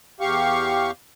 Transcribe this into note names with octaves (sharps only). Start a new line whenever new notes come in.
E2 G4 F5 C#6